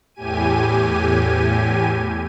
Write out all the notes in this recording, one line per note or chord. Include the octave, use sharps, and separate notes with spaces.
E2 A2 G4 G#5 D#7